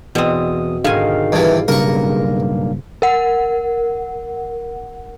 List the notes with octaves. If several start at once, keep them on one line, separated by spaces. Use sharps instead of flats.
E2 B2 C4 D#6
G#2 D3 D#3 F5 G#5
G2 C3 E3
B1 G2 C#3 G3 A#3 A#4 C#6
A#4 F#5